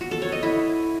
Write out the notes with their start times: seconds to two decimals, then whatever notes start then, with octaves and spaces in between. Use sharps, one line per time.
0.01 F#4
0.11 A4
0.22 C#5
0.32 D#5
0.43 E4